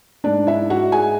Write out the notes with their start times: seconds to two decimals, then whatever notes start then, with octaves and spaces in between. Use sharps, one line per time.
0.24 G#2 G#3 D4 D5
0.47 E4 E5
0.70 F#4 F#5
0.92 G#4 G#5